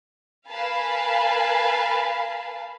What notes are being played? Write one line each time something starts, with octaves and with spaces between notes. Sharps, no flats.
A#4 B4 F5 G#5 A5 B5